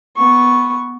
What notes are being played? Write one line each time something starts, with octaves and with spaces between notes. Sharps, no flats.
B3 C#6